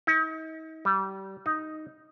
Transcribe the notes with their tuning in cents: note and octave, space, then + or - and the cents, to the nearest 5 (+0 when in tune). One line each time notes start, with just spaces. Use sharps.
D#4 +40
G3 -25
D#4 +0